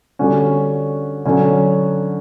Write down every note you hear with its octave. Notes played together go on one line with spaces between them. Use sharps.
D3 G3 C#4 F#4
D3 F#3 C#4